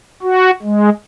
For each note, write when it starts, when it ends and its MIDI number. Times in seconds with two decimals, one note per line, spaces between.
0.23 0.51 66
0.62 0.90 56